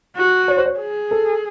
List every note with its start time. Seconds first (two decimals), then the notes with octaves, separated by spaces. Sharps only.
0.16 F#4
0.48 C#5
0.57 C5
0.66 C#5
0.80 G#4
1.11 A4